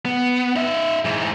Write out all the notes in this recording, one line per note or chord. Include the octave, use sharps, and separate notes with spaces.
B3
D#4 E5
G#2 E3